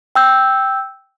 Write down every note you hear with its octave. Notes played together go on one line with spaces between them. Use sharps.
G5 E6 G6